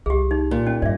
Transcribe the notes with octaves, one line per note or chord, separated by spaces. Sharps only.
C2 G4 G#4
D#4
A#2
C#4
G2 D5 E5